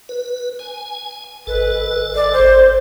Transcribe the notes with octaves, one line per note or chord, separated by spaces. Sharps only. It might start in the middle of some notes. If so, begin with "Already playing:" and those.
B4
G#5
G#1 A4 B4
D5
C5